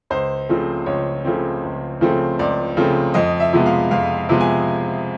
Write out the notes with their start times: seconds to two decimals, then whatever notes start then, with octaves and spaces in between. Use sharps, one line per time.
0.10 C#2 C5
0.49 C#3 F3 A3 C4
0.86 C#2 C#5
1.24 C#3 F3 A3 C4
1.63 C#2
2.01 C#3 F3 A3 C4
2.39 C#2 D5
2.77 C#3 F3 A3 C4
3.14 F2 D#5
3.40 E5
3.53 C3 F3 G#3 B3
3.66 F5
3.91 F2 F5
4.29 C3 F3 G#3 B3
4.41 G#5